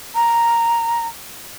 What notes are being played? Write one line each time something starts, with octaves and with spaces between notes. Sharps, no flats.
A#5